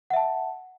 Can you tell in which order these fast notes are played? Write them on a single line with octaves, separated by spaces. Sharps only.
F#5 E5 A5